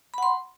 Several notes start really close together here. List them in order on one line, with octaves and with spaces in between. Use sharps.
B5 F#5 C6